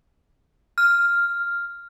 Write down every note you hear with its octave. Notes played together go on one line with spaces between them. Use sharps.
F6